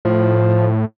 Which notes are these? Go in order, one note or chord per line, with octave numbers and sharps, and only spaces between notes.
A2 F3